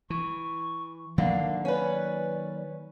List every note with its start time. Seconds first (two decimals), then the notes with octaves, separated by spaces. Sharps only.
0.10 E3 C#6
1.18 D3 D#3 F#3 A#3 F5
1.65 C#4 B4 D5